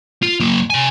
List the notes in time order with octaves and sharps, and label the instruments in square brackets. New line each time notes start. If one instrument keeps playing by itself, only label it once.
[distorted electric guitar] F4
F#3 A#3
C3 G#5